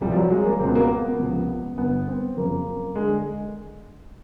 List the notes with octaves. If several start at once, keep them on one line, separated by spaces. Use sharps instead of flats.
C2 C3 F3 G3
F3
F#3
G#3
A#3
C#2 B2 C4
B3
A#3
B3
C#2 C3 F3
G1 G2 D3 B3
C4
F#1 F2 C#3 F3 A#3
D3 G#3